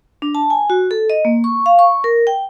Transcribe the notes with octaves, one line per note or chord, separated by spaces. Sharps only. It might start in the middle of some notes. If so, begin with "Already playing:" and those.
D4
A5
G#5
F#4
A4
D#5
A#3
C#6
F5
C#6
A#4
G5